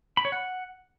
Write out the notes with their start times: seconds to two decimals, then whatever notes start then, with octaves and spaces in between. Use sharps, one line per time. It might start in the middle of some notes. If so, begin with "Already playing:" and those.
0.17 B5
0.25 C#5
0.32 F#5